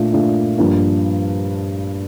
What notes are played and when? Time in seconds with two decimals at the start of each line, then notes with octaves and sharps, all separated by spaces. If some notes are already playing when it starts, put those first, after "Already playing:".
Already playing: A#2 A3 D4 F4
0.13 A#2 A3 D4 F4
0.58 G2 F3 A#3 D4